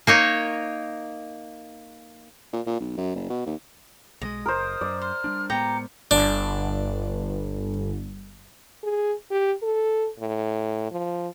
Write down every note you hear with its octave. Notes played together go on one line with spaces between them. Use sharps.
A#3 D#4 C#5
A#2
A#2
B1
F#2
F#1
B2
D#2
B1 F#3 G#3 D#5
F#1 A#4 C5 D#6
F#2 D5
C5 F6
G3 A#3 D4
A2 G#3 B3 G4 G5 A#5 C#7
G1 D4
G#4
G4
A4
A2
F3